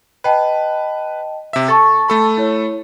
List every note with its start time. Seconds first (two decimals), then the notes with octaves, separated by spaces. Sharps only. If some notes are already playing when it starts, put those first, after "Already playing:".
0.24 B4 D#5 G5 A5
1.53 C3 E5
1.68 A4 A5 C#6 A6
2.08 A3 A4 B5
2.37 E4 C#5